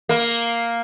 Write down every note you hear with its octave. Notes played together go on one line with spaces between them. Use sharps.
A#3